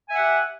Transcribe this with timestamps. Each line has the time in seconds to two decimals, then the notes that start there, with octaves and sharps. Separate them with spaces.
0.08 G#5
0.11 E5
0.15 F#5
0.18 G4